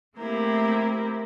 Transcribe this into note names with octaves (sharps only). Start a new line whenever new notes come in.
A3 A#3 C4 E4 G4 A#4